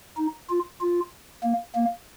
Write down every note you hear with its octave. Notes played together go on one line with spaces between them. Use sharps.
D#4
F4
F4
A#3
A#3